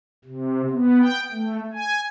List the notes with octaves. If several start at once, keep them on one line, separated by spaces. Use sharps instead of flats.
C3
B3
G5
A3
G#5